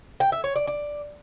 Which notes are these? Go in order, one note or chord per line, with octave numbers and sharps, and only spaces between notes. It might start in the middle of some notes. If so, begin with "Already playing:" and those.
G5
E5
C#5
D5
D5